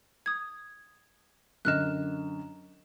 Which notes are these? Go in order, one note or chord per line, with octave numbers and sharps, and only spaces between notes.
D#6 G#6
F#2 D3 D#5 F6 F#6 E7